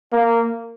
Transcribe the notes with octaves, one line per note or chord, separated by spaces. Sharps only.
A#3